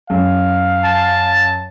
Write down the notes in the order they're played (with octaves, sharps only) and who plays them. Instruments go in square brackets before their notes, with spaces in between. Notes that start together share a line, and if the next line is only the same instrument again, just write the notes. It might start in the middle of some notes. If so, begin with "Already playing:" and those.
[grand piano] F#2 [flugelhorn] F5
[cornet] A5